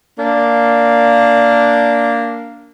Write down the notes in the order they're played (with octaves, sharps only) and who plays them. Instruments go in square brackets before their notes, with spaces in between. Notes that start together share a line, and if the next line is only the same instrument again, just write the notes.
[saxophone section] A#3 D4